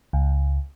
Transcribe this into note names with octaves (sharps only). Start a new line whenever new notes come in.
C#2